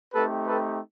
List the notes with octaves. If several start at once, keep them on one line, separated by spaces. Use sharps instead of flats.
A3 C4 D#4 G4 A4 B4
A4 B4